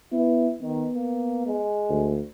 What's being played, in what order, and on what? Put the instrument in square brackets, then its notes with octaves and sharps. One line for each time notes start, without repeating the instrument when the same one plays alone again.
[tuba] B3 [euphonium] E4
[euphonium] D#3 [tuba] B3
[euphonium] A#3
G#3
[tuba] D2